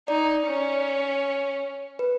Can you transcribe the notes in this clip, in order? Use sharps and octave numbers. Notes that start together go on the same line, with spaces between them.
D#4 D5
C#4
B4